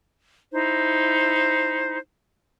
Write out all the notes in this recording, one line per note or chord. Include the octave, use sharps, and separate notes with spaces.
D#4 E4 C5